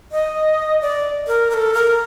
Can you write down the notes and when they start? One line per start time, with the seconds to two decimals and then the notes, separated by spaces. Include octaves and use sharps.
0.12 D#5
0.82 D5
1.28 A#4
1.50 A#4
1.54 A4
1.74 A#4